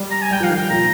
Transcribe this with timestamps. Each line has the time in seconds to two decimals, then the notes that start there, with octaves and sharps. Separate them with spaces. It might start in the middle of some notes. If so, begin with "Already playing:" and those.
Already playing: G3
0.11 A#5
0.22 G#5
0.31 G3 G5
0.40 F3
0.44 F5
0.50 D#3
0.57 G5
0.70 A#2 A#5